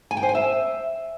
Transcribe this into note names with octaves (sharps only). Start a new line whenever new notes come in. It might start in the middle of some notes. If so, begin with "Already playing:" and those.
G#5
G5
C5
G#5
E5